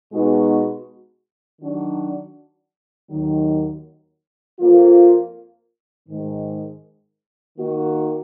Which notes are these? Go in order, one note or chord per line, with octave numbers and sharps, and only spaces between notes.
B2 G#3 B3 D#4 F#4
D#3 F#3 D4 F#4
D#2 D#3 F#3
F2 F3 A#3 F4
G#2 D#3 G#3
D#3 A#3 D#4 F#4